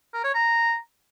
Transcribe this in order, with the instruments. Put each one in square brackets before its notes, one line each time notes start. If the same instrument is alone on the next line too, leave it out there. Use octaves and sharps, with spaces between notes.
[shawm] A#4
C#5
A#5